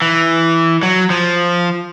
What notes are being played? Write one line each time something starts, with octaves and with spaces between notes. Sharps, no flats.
E3
F#3
F3